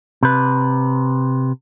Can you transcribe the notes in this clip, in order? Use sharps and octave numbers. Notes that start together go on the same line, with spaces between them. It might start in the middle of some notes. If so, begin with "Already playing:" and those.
C3 B4